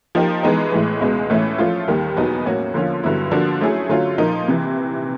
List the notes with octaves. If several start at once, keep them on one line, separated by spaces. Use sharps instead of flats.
F3 A#3 D#4 G4 A#4
E3 G#3 B3 D#4
A2 E3 G#3
C#2 B2 G#3
A2 E3 A3 C#4 E4
F3 A3 C#4 F4
D#2 D#3 G3
E2 B2 F#3 B3 D#4
A2 F#3 A#3 C#4 F#4
D3 F3 A#3 C#4 F4
G2 D3 F#3 B3 E4
D3 F3 A#3 D4 F#4
F#3 A3 C#4 E4 G#4
D3 F#3 A3 C#4 F4
A#2 F3 A#3 D#4
C3 E3